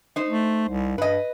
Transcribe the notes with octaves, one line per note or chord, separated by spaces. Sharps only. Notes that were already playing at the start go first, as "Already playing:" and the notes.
D#4 C5
A3
C2
G2 B4 D#5